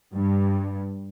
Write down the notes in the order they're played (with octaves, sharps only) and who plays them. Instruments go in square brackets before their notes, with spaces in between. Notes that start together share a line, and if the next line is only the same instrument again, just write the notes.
[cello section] G2